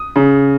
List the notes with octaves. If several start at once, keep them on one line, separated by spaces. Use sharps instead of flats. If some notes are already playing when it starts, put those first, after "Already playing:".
Already playing: D#6
C#3